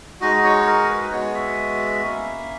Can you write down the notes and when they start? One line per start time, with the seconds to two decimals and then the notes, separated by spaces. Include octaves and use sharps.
0.21 G#3 D#4 F#4 D#5
0.44 C#5
0.67 A#4
0.89 B4
1.11 G#3 B3 F#4 C#5
1.35 E5
2.03 A#3 C#4 E4